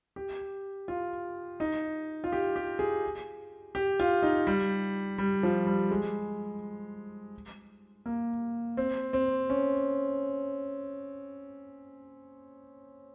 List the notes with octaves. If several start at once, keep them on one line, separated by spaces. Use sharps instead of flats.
G4
F4
D#4
F4
G4
G4
G#4
G4
F4
D#4
G3
G3
F3
G3
G#3
A#3
C4
C4
C#4